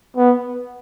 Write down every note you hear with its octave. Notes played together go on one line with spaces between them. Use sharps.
B3